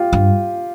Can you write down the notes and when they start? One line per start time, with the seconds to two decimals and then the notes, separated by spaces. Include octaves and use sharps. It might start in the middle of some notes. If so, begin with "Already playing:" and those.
Already playing: F4 G4
0.13 G2